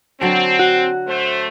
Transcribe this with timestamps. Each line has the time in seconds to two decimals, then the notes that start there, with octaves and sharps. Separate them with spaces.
0.21 D3 F#3 C4 A4
0.59 F#4
1.07 A3 C5